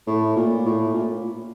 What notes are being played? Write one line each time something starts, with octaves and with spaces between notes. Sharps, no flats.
A2
A#2
A2
A#2